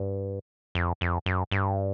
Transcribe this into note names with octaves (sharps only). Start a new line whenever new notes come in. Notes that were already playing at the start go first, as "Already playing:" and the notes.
Already playing: G2
F2
F2
F#2
G2